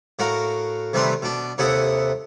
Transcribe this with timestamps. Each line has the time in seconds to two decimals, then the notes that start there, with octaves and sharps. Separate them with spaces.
0.19 A2 F#4 A#4 F5
0.93 C3 D#3 G3 A3 B4 C6
1.22 B2 D4
1.58 D#2 C3 E4 A4 F#5 D#6